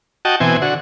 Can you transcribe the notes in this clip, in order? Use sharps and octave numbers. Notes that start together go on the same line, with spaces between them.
F#4 D#5 G5 A5
B2 E3 C4 G#5
D3 F#4